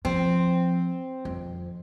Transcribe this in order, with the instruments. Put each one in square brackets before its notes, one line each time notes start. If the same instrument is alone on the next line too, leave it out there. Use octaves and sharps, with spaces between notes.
[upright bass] F3 [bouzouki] C4
[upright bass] F2